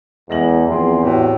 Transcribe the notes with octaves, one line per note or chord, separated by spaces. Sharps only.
E2 G#3 A#6 F#7
E2 F3 C4 G#4
A2 C4 F#4 G4